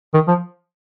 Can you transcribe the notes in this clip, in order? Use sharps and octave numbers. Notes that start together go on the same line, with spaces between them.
D#3
F3